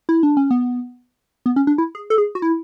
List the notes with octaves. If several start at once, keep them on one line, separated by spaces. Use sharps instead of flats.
E4
D4
C#4
B3
B3
C#4
D4
E4
G#4
A4
G#4
F#4
E4